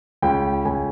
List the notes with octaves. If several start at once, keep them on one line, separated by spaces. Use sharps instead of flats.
C#2 G5
C#2 G#5